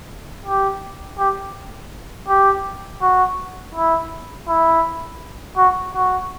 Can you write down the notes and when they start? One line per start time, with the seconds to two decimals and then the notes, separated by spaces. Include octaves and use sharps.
0.46 G4
1.18 G4
2.28 G4
3.02 F#4
3.75 E4
4.48 E4
5.57 F#4
5.95 F#4